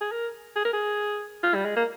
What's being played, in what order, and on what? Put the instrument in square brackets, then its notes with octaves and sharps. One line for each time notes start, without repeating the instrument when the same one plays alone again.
[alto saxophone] G#4
A#4
G#4
A#4
G#4
F4
G3
G#3
A#3